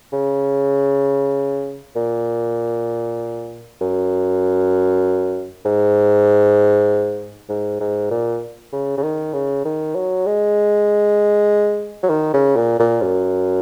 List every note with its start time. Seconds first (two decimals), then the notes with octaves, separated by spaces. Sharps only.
0.13 C#3
1.96 A#2
3.81 F#2
5.65 G#2
7.49 G#2
7.80 G#2
8.11 A#2
8.73 C#3
8.97 C#3
9.03 D#3
9.34 C#3
9.65 D#3
9.95 F#3
10.26 G#3
12.03 F#3
12.10 D#3
12.34 C#3
12.56 A#2
12.79 A#2
13.02 F#2